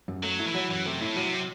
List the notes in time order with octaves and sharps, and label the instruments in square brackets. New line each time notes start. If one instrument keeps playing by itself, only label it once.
[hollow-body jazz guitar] F#2
[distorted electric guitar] F#3 [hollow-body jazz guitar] A3
[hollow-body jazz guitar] E4
[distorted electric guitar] E3
[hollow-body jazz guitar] F#3
[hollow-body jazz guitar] F#2 [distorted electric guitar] E3
[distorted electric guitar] C3 [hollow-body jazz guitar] A3
[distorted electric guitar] A2 [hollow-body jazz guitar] E4
[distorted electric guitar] C3 [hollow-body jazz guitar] F#3